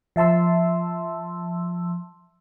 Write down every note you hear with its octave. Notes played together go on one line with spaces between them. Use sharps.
F3 E5 A5 C6 E6